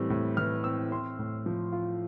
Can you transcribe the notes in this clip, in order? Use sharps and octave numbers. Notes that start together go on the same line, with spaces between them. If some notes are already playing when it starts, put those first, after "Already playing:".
Already playing: A2 E3 G3 C4
A2
E3 F6
C4 E6
C4 C6
A2
F3
F4